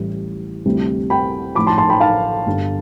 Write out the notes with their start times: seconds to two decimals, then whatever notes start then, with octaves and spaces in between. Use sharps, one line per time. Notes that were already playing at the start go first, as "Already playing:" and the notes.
Already playing: A1 A2 E3 G3
0.66 D2 C3 E3 G3
1.10 G5 B5
1.55 A1 A2 F3 B5 D6
1.67 A5 C6
1.78 A5 C6
1.89 G5 B5
2.01 F5 A5
2.46 G1 G2 D3